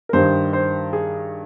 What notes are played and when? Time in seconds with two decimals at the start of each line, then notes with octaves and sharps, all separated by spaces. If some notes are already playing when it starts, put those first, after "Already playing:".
0.09 A#4
0.13 G2 D#3 C5
0.53 C5
0.93 G#4